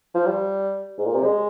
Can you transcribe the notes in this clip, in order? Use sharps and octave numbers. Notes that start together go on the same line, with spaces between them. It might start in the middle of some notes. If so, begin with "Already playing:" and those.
F3
G3
G#2
A#2
C3
G#3